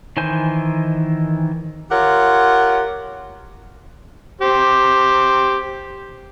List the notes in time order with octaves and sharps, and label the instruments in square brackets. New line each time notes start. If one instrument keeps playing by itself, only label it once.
[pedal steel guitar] D#3 E3 C5 G#5 G6
[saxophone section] F4 G4 A#4 C#5 F#5
[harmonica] G4 C5